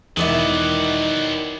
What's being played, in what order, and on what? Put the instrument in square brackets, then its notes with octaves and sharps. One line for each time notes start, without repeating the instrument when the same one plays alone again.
[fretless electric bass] E1 E2 [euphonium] D#3 [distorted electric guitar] F#3 B3 [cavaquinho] E4 D5 D#5